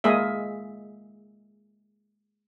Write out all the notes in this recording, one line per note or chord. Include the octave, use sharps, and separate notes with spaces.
G#3 A#3 G#4 D#5 E5